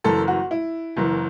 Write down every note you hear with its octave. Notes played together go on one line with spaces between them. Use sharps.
F#1 F#2 E3 A4
F#4
E4
F#1 F#2 E3